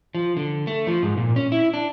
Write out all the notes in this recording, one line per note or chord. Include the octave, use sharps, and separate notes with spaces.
F3
D3
A3
F3
G#2
A#2
C#4
E4
D4